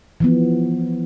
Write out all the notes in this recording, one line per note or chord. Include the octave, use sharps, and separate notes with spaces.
E3 F3 B3